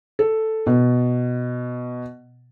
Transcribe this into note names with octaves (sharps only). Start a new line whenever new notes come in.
A4
B2